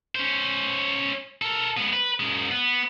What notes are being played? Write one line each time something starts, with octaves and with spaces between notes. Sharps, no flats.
C#4 C5
A4 A#4
G#3 B3
B4
F#2 G#3
B3